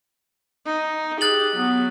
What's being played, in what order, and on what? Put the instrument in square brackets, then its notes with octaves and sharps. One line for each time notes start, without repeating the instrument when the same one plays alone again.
[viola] D#4
[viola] G4 [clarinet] G#4 [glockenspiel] F#6 A6 F#7
[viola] F#3 [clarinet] B3